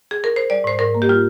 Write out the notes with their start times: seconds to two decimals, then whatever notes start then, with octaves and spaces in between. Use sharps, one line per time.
0.11 G#4
0.24 A#4
0.36 C5
0.50 G3 D5
0.64 G#2 C5
0.79 G#2 A#4
0.95 A#3
1.02 G4
1.09 G3 F4